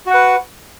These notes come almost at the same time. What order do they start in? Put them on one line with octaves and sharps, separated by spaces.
F#4 F#5 B4